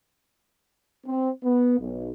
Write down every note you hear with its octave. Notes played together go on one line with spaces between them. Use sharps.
C4
B3
B1